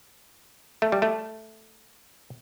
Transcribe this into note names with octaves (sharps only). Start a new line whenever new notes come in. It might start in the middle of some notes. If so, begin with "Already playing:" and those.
A3
G3
A3